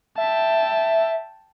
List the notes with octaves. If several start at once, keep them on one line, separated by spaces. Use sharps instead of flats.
E5 G5 A5